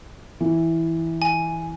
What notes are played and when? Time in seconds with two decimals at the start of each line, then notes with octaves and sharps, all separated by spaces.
0.41 E3
1.22 G#5